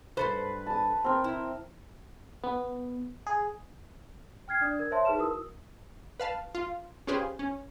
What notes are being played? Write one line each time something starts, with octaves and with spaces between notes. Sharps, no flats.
G2 A4 B4 C5
A5 D#6
C4 A#4
E4
B3
G#4
G5 F6 G#6 C7
D4 D5 D#6
A#4 G#6
C5 C#5 E5 A5 C6
D#4 G#4 B4 A5 E7
E4 F#4 A#4 D#6 E6
B4 F5 A5
F4
C#4 F4 G4 G#4 B4 C5
C#4